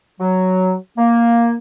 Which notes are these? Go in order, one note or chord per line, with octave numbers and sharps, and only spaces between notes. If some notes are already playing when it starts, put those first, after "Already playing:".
F#3
A#3